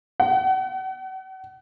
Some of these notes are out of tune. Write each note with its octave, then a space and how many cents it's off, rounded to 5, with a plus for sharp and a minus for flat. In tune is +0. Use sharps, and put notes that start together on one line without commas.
F#5 +40